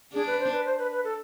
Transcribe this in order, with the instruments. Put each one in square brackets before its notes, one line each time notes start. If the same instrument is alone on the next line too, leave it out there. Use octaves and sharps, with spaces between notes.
[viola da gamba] D4 [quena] G#4
[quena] B4
C5
B4
C5
B4
B4
A4